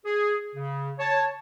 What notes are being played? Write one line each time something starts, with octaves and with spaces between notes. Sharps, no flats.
G#4
C#3
C#5 A5